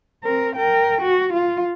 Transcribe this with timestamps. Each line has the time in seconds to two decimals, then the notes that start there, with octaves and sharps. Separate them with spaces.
0.24 C4 A#4
0.55 A#4 G5
1.01 F#4
1.33 F4